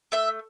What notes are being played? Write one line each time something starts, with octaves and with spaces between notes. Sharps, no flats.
A3 E5